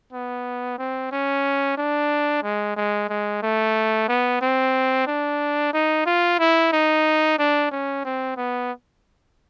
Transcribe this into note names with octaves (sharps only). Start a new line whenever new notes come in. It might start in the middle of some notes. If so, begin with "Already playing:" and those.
B3
C4
C#4
D4
G#3
G#3
G#3
A3
B3
C4
D4
D#4
F4
E4
D#4
D4
C#4
C4
B3